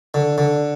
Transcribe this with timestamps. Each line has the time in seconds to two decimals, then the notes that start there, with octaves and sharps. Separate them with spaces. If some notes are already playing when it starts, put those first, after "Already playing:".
0.14 D3
0.38 D3